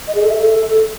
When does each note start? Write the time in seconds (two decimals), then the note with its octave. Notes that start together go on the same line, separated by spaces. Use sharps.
0.07 D#5
0.15 G#4
0.22 A4
0.30 E5
0.37 A4